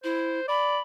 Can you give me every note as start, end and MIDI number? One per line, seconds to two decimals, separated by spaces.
0.04 0.40 64
0.04 0.45 72
0.48 0.78 74
0.48 0.80 83